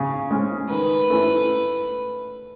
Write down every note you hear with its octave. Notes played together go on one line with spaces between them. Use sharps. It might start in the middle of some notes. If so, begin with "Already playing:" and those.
Already playing: C#3
G#3 C#4
D#3 B4
A3 C#4 E4